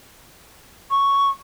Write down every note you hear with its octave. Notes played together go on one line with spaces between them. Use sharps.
C#6